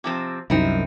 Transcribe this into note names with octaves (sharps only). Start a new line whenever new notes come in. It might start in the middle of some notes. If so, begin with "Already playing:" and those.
C3 F3 C4
C2 F#2 C4 D#4 E4